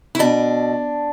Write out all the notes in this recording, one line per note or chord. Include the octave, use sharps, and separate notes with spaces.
E4
B2 D4